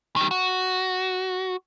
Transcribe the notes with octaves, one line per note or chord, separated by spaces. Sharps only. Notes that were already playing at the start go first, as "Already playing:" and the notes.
D#3 G3
F#4